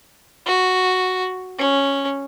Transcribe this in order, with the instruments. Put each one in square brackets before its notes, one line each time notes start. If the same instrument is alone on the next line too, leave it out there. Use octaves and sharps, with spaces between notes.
[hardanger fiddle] F#4
C#4